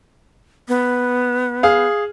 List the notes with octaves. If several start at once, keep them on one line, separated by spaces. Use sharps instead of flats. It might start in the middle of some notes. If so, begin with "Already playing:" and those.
B3
G#4 F5